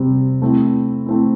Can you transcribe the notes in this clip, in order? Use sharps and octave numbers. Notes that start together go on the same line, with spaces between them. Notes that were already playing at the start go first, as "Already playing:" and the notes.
Already playing: C3 G3 C4
A3 C4 E4
A3 C4 E4